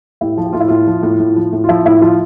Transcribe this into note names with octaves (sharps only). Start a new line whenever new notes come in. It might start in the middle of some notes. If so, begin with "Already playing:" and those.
A2 E4 G4
F3
G4
A2 F4
E4
A2 F4
F3
A2
A2
F3
A2
F4
F3 E4
A2 E4
F3 F4